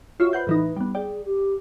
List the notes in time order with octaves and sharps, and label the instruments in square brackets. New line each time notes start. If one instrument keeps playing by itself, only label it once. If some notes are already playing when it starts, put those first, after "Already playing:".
[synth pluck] F4 C#5 E5 [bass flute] F#4
[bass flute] B4 [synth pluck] C5 F#5 G6
[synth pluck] A2 E3 D#4
G3 B3
[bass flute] G#4 [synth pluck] D5 G5
[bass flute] G4